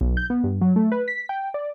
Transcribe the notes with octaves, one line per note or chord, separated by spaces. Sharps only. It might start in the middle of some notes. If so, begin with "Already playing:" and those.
B1
G6
B3
G2
F#3
A3
B4
B6
G5
D5